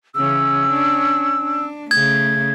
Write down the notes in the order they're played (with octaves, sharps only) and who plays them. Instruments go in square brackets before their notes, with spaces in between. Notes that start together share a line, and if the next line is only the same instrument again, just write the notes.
[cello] C#3 E3 [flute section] C#4 E6
[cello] D4
D4
[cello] C#3 A3 [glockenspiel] G#6